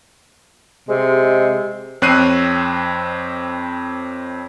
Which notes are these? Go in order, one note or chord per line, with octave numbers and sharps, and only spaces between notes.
C3 G#3
F2 C4 C#5 F#6 C7 D#7